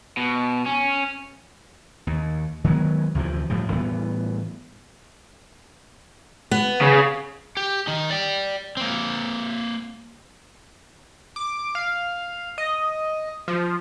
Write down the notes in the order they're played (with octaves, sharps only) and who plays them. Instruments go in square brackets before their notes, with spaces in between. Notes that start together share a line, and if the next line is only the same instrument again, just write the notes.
[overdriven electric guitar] B2
C#4
[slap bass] D#2
D#3 F#3 G#3 B3
D2 C3 E3 F3
F2 A2 F3 G3
A2 E3 G3 B3
[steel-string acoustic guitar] B3
[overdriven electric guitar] C#3
G4
D#3 D#4
D5 G5
A#3 C4
[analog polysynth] D6
F5
D#5
F3